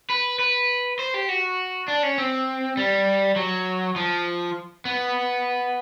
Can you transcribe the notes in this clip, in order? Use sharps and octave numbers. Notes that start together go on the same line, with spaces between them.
B4
B4
C5
G4
F#4
D4
C#4
C4
G3
F#3
F3
B3